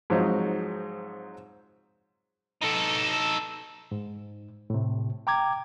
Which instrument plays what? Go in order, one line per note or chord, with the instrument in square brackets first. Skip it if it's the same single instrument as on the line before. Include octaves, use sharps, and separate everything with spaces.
[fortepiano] G#2 F3 F#3 C4 D#4 F#4
[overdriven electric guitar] D#4 A4
[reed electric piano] G#2
A2 C3
G5 A#5 D6 G#6